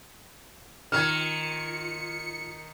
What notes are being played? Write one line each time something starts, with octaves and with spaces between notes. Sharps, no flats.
D#3 F4 F6 G#6 C#7